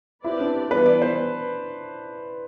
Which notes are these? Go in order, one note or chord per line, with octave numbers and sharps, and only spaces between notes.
C4 E4 G4 B4 D5
D4
E3 G3 B3 B4
D5
C5